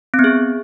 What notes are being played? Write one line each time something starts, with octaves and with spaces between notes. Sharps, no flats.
C4
B3
G#4